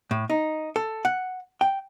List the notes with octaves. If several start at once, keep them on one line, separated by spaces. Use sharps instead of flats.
A2
D#4
A4
F#5
G5